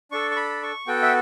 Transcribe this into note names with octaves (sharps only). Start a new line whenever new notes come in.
D4 A4 C#6
C#6
B5
C#6
B3 F#4 A4 G5
E5